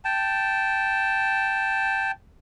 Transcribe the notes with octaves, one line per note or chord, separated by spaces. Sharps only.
G5 A5